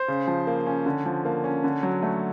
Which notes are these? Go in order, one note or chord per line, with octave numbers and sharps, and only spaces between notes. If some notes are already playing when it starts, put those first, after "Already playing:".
Already playing: C5
C#3
F3
A#3
C#4
D3
F3
A#3
C#4
D3
F#3
A3